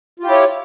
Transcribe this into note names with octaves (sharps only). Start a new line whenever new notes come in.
E4 F4 G4 C#5